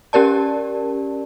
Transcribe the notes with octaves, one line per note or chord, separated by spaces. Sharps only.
C#4 G4 A#4 D5 A5